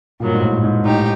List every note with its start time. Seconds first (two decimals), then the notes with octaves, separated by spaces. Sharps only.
0.20 G2 A#2 D#3 F#3
0.34 G#2
0.42 A2
0.64 G#2
0.85 A2 D#4 G4